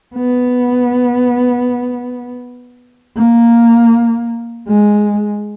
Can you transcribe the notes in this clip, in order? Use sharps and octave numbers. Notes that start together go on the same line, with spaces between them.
B3
A#3
G#3